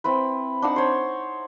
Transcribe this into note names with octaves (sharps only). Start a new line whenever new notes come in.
C4 E4 B4
D4 D#4 F#5 A5
C5 C#5